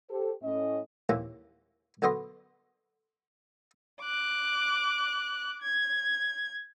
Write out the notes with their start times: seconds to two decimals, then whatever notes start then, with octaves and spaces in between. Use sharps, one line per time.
0.10 G4 A4 C5
0.43 A2 C#4 D#5
1.09 D#2 C3 E3 A#3 C#4
2.02 F#2 D3 B3 D#5 C6
4.01 D6 F#6
5.62 G#6